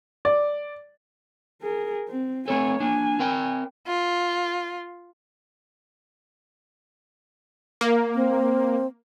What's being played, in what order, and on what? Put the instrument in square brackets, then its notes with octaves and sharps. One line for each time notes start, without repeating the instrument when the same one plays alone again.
[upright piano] D5
[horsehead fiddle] G#4 A#4
C4
[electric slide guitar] A3 C4 A4 [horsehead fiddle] C#5 G#5
[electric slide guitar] A#3 D4 [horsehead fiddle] G#5
[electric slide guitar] C4 A#4 G5
[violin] F4
[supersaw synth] A#3
[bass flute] C4